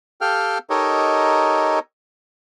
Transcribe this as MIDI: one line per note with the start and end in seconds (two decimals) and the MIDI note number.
0.21 0.58 67
0.21 0.58 69
0.21 0.58 77
0.21 0.58 79
0.21 0.58 89
0.70 1.79 63
0.70 1.79 67
0.70 1.79 69
0.70 1.79 70
0.70 1.79 73
0.70 1.79 75